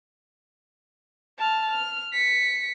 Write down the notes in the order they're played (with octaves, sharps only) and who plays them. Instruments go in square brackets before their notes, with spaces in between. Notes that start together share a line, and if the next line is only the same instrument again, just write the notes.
[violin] A5 F6
F6
B6 C#7